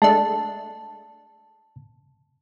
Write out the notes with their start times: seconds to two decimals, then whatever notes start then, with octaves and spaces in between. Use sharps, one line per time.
0.02 G#3 A3 D4 A5